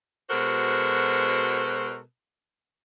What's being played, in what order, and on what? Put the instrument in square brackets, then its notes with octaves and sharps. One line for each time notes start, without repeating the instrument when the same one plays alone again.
[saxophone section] B2 G#3 F#4 A4 A#4 C5